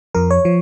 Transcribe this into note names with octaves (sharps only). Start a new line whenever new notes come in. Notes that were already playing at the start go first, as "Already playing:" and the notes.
F2 F3 A#4
C#5
F3